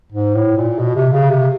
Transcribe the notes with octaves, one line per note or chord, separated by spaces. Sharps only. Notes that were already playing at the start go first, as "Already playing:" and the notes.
G#2
A2
A#2
B2
C3
C#3
C3